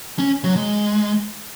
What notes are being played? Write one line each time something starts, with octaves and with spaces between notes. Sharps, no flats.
C#4
F#3
G#3